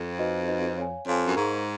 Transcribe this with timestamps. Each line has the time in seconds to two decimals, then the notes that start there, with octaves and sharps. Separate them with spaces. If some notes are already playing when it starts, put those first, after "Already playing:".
Already playing: F2
0.19 D#4 F#4 B4 D#5
0.48 D#4 F#4 B4 D#5
0.78 C#5 F5 G#5
1.07 F2 C#5 F5 G#5
1.27 F#2
1.36 G#2 A#4 F5 A#5 C#6